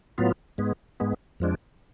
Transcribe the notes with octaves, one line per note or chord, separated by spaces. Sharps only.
A2 F#3 B3 F4
G#2 G#3 B3
G#2 G#3 B3
F2 F3 G#3 D4